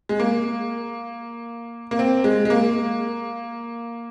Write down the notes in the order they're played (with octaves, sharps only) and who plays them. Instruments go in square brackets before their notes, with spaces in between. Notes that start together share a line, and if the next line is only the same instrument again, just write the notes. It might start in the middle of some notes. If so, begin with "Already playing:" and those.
[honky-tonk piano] G#3
A#3
A#3
C4
G#3
G#3
A#3